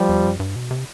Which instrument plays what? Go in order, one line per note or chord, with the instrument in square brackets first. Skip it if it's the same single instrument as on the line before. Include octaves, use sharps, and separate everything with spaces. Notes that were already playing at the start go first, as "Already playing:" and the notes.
Already playing: [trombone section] F3 G3
[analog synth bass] E2
F#2
G2
B2
C3